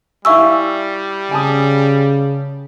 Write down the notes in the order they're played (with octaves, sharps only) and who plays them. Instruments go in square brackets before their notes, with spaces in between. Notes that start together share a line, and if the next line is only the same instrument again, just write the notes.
[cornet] G3 [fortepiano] E4 F5 G#5 [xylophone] E5 C#6 E6
[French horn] C#3 [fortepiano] G#5 A5 D#6